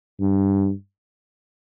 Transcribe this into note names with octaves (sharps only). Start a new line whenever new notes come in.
G2